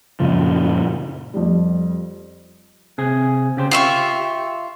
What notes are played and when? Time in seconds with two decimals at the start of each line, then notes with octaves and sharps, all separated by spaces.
0.20 F#2 A#2 C#3 F3
1.34 F2 G3
2.98 C3 G#4
3.57 C#3 G4 C5
3.71 F4 G4 E5 C#6